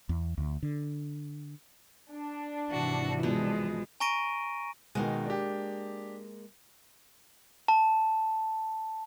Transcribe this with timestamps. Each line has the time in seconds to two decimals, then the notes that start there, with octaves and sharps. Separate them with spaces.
0.09 E2
0.38 D2
0.63 D3
2.12 D4
2.71 G#1 C3 E3 F#4
3.23 B2 F3 G#3 B3
4.00 G#5 A#5 C#6 A#6 D7 D#7
4.95 B2 D#3 G#3 A#3
5.26 D4 G4
7.68 A5